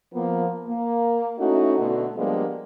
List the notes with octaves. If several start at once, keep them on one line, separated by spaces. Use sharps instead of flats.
F3 A#3 B3
A#3
A3 C#4 D#4 E4 F#4
B2 D3 A3
F3 G3 G#3 A#3 B3 D4